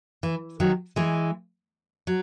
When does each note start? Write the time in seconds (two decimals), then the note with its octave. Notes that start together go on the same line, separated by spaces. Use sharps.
0.23 E3
0.60 D#3 F#3
0.96 E3 G#3
2.07 F#3